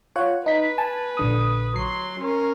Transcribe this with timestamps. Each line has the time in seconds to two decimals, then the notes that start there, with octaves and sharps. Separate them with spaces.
0.16 F4 C#5 F#5
0.46 D#4 B4 B6
0.78 G#5 A5
1.17 A#1 D3 D#6
1.76 F#3 C6 C7
2.20 C#4 A#4